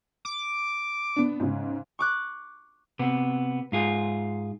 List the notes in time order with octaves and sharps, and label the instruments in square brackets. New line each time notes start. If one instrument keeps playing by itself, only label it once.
[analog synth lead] D6
[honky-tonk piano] B3 D4
G#2 C#3
[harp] C#6 D6 F#6
[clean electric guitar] C3 B3
G#2 F4 G#4